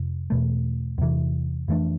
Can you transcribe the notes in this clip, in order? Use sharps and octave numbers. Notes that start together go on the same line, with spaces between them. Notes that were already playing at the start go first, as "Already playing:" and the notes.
Already playing: F2 C3
E2 B2 A3
E2 C3 E3
F2 E3 A3 D4